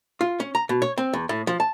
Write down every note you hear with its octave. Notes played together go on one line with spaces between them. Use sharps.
F4
C#4
A#5
B2
C#5
C4
E2
A2
F3
A5